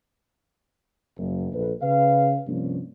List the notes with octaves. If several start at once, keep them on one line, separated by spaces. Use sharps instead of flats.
F#1
A#1 A4 B4
C#3 B4 F5
G2 C3 F3 A#3 C#4 D4